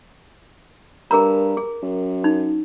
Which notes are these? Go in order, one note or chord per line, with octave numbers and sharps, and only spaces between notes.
G2 G#4 A#4 A#5
G#4
F#2
D#4